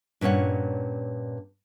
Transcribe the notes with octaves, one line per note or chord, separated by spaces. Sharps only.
G2 A#2 C#4 C#5 F#5